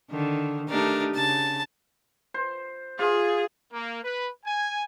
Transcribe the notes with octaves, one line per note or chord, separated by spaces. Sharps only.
D3 D#3
A3 D4 D#4 G4 A#4
C#3 A5
C5
F4 G#4
A#3
B4
G#5